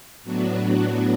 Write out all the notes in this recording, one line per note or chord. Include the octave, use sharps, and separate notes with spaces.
A2 F#3 B3 D4 F#4